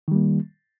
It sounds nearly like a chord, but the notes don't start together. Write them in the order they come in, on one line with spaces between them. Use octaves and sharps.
D#3 G3 A#3